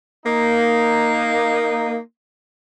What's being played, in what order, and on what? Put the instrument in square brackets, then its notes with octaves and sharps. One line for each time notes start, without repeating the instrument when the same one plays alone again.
[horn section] A#3 D#4